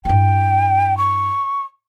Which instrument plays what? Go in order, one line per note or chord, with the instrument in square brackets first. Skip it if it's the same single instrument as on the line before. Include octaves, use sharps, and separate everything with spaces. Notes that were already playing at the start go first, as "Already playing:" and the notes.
[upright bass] G2 E4 [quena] G5
[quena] C#6